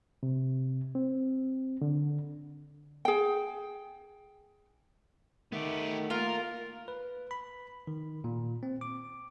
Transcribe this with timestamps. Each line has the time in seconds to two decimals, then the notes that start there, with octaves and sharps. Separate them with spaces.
0.23 C3
0.95 C4
1.82 D3
3.05 G#4 G5
5.52 D#3 A3 B3 G4
6.10 A#3 F4 A#4
6.88 B4
7.31 B5
7.87 D#3
8.24 A#2
8.63 C4
8.81 D6